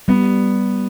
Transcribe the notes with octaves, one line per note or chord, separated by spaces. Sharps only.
G3 B3